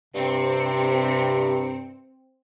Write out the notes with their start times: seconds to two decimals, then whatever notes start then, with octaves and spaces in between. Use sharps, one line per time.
0.14 G2 C3 C4 C#7